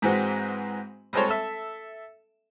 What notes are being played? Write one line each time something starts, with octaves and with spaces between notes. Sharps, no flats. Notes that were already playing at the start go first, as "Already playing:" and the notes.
G#2 E3 G#3 C4 F#4
G3 G#3 C4 A4 C5 C#5
A4 E5